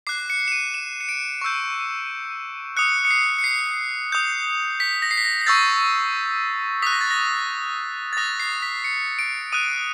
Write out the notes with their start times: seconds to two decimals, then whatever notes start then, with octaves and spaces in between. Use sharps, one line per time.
0.07 D6 F#6 C7
0.30 C#7
0.48 E7
0.52 D#7
0.74 E7
1.01 C#7
1.09 D7
1.42 C#6 E6 G6
2.77 D#6 F#6 C#7
3.05 C#7
3.10 C7
3.39 C#7
3.44 C7
4.12 D#6 G6
4.80 B6
5.02 A#6
5.11 C7
5.18 B6
5.25 A#6
5.41 A#6
5.47 C#6 E6 G6 A6
6.82 D#6 F#6 B6
6.92 A#6
7.01 A6
7.11 A#6
8.13 A6
8.17 D#6 F#6 A#6
8.40 C7
8.62 B6
8.84 C#7
9.19 D7
9.52 D#6 F#6 D#7